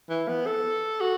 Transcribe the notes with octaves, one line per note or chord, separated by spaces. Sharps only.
E3
B3
A4
F#4